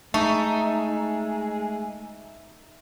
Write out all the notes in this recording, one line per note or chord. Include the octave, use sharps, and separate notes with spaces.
G#3 A3 D#4 E5 A5 C#6